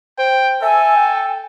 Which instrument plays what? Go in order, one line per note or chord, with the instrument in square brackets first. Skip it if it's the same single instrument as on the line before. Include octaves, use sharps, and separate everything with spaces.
[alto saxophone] C5 [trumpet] G5
[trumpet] A4 [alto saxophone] E5 [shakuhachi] G#5
[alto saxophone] G5